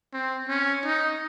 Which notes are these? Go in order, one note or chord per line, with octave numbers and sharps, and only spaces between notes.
C4
C#4
D#4